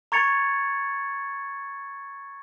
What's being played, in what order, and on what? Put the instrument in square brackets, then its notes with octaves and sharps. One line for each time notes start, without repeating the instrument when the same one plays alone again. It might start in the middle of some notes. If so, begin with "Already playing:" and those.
[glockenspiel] A#5 C#6 G#6 A6 C#7 F7